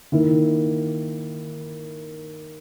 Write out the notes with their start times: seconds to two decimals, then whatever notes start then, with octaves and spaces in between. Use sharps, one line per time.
0.12 D#3 A#3 E4